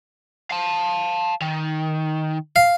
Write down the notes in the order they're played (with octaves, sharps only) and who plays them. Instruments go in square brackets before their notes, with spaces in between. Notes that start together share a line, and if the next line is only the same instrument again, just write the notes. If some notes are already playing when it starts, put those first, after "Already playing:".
[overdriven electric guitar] F5 A5
D#3
[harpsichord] F5